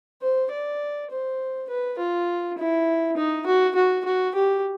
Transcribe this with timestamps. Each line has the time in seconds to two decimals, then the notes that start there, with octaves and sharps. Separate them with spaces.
0.22 C5
0.51 D5
1.11 C5
1.69 B4
1.99 F4
2.58 E4
3.17 D#4
3.46 F#4
3.76 F#4
4.05 F#4
4.35 G4